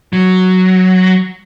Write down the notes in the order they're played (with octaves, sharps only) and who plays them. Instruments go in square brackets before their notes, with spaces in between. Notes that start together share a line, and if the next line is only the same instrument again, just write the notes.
[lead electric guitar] F#3